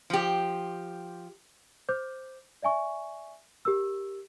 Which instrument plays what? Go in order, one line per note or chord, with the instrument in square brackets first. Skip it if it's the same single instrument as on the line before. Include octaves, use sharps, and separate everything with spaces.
[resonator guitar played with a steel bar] F3 G4
[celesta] C5 D6 G6
D5 E5 G#5 C#6
G4 A#4 E6